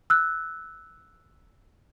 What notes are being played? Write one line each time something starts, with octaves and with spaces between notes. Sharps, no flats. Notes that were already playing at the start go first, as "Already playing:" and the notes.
E6 F#6